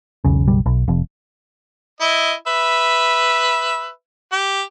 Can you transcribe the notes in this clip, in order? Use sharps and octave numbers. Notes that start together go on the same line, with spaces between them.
E1 B1 C#3
F#1 B1 G3
B1
F1 F2
E4 D#5
B4 E5
G4